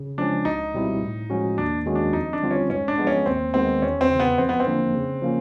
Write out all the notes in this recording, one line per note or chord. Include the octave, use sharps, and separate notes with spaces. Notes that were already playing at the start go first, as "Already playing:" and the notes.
Already playing: C#3
F3 G#3 C#4 D4
C#2 D#4
B2 G3 C4 E4
A2
F3 G#3 C#4 F#4
D#2 D4
D#3 G#3 C#4 F#4
D4
F2 D#4
D4
D3 G3 C4 F4
C#4
G#2 C#4
D4
F3 G#3 B3
C#4
D#2 C4
D#3 G#3 B3 C4
E2 C#4
C4
C#3 E3
B3
F2 C4
B3
C4
D3 F3 A#3 D4
C#3
F3 A#3 C#4